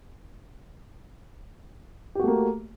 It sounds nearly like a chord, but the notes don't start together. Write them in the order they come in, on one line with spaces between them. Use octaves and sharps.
G4 F#4 A3 A#3